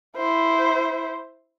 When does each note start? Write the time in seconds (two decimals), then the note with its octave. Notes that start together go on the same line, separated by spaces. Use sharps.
0.16 E4 C5